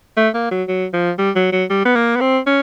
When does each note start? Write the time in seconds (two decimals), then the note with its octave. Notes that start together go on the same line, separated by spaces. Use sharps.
0.17 A3
0.34 A#3
0.51 F#3
0.68 F#3
0.93 F3
1.18 G3
1.36 F#3
1.52 F#3
1.70 G3
1.85 B3
1.95 A#3
2.16 B3
2.21 C4
2.46 C#4